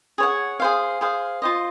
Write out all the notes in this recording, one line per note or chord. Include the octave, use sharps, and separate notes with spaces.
G#4 C#5 F#5
G#4 C5 F5
G#4 C5 F5
F4 C5 D#5